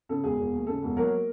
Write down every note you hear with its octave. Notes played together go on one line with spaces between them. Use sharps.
C#3 A4
E1 G#4
E1
D#2
C#3 A4
E1
F#3 A#3 A#4